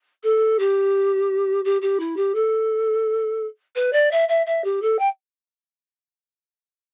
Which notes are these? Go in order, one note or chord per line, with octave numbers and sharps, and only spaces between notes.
A4
G4
G4
G4
E4
G4
A4
B4
D5
E5
E5
E5
G4
A4
G5